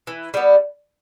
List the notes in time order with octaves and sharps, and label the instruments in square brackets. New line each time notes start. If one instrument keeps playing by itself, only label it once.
[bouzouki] E3
G3 B3